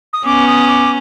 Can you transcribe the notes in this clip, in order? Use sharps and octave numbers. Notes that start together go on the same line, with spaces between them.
D#6
B3 C#4 D6
D#6
D6